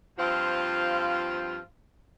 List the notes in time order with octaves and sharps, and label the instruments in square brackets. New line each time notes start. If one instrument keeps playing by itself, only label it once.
[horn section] G2 F3 C4 F4